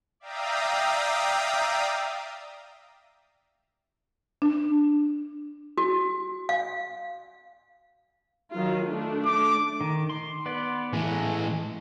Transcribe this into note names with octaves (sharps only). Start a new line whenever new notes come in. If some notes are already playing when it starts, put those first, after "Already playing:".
D5 E5 F5 G5 A#5 D#6
D4
F#4
F5
D#3 F#3 F4
A3 D4
D6
D#3
C6
B3 B4 D5
A2 E3 G#3 A3